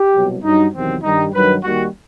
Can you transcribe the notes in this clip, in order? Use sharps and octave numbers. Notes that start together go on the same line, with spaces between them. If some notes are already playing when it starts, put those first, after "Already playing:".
Already playing: G4
C2 B2 F#3
G2 F#3 D#4
E2 C3 D#3 F#3 C4
G2 D#3 G3 D#4
G2 D#3 F#3 B4
D#2 D#3 G3 F#4